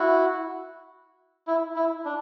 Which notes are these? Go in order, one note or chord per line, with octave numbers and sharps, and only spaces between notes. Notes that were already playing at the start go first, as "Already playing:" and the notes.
Already playing: E4 F#4
E4
E4
D4